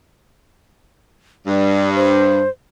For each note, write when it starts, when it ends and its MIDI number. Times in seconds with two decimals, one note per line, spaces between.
1.47 2.43 43
1.47 1.90 74
1.95 2.49 72